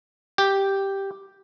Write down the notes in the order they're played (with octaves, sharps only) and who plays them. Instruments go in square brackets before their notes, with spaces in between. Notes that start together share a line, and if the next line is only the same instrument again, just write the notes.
[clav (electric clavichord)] G4